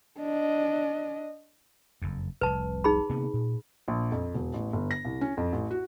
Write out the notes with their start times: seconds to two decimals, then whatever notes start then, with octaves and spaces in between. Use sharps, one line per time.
0.20 D4 D#5
2.02 F#1 F2
2.41 F1 C2 B4 A5
2.84 D#4 G#4 B5
3.10 C3 A#3 B3
3.34 A#2
3.88 A#1
4.12 F2
4.34 E1
4.54 A1
4.73 G1
4.91 A#6
5.05 C2
5.21 C#4
5.37 F2
5.52 A1
5.71 F#4